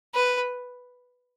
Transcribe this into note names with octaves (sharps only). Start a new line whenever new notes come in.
B4